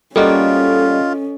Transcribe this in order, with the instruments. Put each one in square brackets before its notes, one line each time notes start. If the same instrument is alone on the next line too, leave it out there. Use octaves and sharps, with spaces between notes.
[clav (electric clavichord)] G3 A#3 F#4 [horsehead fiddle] C#4 [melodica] F4 [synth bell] A4 D#5